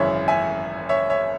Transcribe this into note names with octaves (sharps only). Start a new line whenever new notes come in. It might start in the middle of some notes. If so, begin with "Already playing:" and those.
Already playing: G#1 F#2 C#3 E3 C#5 E5
E5 G#5
C#5 E5
C#5 E5